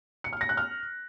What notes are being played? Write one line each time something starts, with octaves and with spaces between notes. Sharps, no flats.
C#7
F6
A#6
F#6
F6